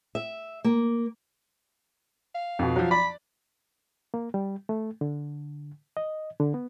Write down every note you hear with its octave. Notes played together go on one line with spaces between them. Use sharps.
E5
A#3
F5
F2 B2
F3 F#3
D5 B5
A#3
G3
A3
D3
D#5
D3
B3